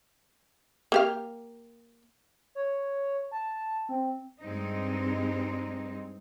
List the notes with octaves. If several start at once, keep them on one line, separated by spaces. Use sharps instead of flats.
A#3 G4 F5
C#5
A5
C4
G2 G#3 C4 D#4